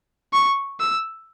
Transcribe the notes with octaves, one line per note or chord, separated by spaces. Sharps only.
C#6
E6